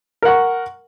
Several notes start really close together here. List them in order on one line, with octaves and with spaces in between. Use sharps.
A#4 F#5 C#6